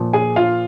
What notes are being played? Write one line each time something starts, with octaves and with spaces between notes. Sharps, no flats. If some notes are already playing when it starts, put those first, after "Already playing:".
Already playing: A#2 F3
G#4 G#5
F4 F5